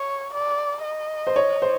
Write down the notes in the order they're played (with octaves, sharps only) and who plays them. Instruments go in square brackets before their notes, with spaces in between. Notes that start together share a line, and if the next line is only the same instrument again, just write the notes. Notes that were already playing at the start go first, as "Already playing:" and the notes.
Already playing: [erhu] C#5
D5
D#5
[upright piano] C5
C#5
C5